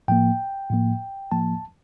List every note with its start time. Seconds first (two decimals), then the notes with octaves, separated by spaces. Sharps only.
0.08 A2 F3 A#3 G5
0.70 A2 F3 A#3
1.31 A2 F3 A#3 A5